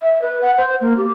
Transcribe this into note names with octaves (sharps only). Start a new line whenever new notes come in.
E5
B4
F#5
C5
A#3
G4